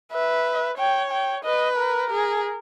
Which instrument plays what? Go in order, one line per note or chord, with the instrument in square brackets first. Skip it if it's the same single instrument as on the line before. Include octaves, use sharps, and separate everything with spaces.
[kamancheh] B4 [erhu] E5
[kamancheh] C#5 [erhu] G5
[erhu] G5
[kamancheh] B4 [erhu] D#5
[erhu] A#4
[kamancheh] G#4